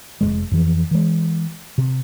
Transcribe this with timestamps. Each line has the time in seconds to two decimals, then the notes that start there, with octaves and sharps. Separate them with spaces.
0.21 F1 C#2 G#3
0.52 F2 E3 F3
0.91 E3 G#3
1.78 C3